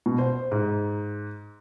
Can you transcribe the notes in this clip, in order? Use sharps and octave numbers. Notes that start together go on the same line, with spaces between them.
B2
C5
G#2